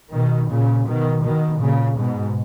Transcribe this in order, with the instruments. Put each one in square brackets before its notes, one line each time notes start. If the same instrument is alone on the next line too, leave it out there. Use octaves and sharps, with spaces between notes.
[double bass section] B2 D#3
A#2 C#3
B2 D#3
B2 D#3
A#2 C#3
G#2 B2